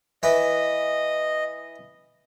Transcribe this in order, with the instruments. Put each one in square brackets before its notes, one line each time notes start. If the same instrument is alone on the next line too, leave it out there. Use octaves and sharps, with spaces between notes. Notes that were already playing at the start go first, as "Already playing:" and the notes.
[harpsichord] E3 E4 B4 [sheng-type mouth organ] D#5